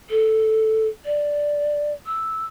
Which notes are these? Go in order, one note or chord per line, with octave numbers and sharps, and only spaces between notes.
A4
D5
E6